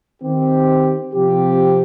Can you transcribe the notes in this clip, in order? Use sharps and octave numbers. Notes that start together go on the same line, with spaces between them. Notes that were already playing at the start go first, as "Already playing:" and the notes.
D#3 C4 G4
C3 F3 C4 G4